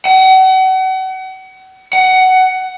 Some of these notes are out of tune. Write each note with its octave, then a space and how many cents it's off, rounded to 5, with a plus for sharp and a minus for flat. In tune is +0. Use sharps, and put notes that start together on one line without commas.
F#5 +35
F#5 +15